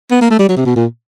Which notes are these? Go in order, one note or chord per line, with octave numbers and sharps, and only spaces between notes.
B3
A#3
A3
G3
F#3
C3
B2
A#2